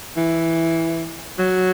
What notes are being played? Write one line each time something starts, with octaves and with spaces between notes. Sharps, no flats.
E3
F#3